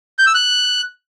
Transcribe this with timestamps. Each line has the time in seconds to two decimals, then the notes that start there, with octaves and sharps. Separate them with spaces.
0.19 G6
0.27 E6
0.34 F#6